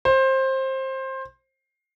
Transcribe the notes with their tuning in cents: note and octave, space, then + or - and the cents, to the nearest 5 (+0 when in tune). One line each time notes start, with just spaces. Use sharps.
C5 +20